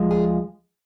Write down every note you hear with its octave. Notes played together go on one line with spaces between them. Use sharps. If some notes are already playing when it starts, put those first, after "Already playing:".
Already playing: D2 F3 G#3
F4 G#4